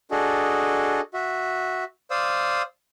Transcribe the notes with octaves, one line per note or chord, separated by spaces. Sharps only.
D4 F#4 G#4 A4 D#5
F#4 E5
C5 D5 F5 D#6 E6